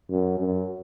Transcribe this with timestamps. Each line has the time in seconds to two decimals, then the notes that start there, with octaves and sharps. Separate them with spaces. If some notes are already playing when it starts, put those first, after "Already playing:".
0.09 F#2
0.39 F#2